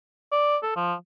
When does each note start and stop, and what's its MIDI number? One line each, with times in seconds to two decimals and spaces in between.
0.32 0.57 74
0.63 0.73 69
0.76 0.94 53